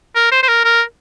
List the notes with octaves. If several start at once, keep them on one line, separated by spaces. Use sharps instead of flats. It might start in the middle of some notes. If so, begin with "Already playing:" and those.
A#4
C5
C5
A#4
A#4